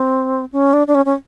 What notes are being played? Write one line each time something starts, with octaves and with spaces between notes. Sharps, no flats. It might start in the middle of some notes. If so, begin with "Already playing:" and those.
Already playing: C4
C#4
D4
D4
C#4
C#4